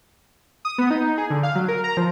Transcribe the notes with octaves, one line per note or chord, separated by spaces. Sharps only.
D#6
B3
D#4
G#4
D3
F5
F#3
A#4
A#5
F3